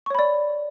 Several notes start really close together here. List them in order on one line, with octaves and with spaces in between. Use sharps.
C#6 C#5 B5 D5